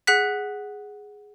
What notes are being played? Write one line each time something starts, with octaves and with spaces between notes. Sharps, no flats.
G#4 F#5 F#6 B6